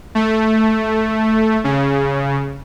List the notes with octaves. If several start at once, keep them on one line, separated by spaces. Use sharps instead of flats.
A3
C#3